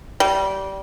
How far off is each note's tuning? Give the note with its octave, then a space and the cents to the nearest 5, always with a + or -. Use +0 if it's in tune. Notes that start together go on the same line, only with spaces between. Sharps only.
G3 -20